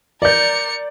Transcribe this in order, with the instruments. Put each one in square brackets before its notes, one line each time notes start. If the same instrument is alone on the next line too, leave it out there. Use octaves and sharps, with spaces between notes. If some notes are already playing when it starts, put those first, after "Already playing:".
[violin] A#4 C#7 [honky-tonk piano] D5 G6